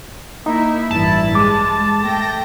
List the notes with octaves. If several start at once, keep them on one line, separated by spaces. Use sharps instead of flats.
A#3 D#4 E4 E5
A1 G2 E4 A5
G#3 D6
A3 G5 A#6